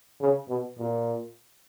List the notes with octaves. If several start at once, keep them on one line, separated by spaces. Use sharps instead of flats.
C#3
B2
A#2